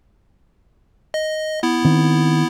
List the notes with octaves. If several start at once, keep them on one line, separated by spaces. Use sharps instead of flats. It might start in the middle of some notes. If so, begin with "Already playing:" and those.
D#5
B3 E4
D#3 C4